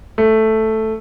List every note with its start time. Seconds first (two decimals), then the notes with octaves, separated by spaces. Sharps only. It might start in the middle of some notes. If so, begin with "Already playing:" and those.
0.18 A3